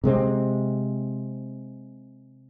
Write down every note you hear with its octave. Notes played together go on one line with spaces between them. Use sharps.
C3 G#3 C4